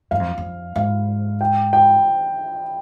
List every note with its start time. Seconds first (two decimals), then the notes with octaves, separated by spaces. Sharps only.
0.11 G2 F5
0.20 F2
0.38 F2
0.76 G#2 F5
1.41 G5
1.73 G5